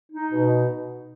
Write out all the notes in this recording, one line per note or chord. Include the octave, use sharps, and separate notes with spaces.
D#4
B2